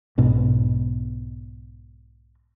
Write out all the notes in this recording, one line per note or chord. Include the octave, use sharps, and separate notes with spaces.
B1 G#2 B2